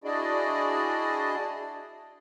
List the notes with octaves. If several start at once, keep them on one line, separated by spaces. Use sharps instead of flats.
D4 E4 F#4 G#4 D5 D#5